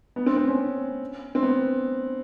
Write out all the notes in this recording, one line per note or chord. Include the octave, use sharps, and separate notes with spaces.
B3
C4
C4
C#4
C4
B3